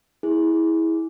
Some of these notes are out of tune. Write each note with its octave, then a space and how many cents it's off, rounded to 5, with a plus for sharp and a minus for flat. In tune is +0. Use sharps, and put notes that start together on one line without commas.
E4 -20 G#4 +0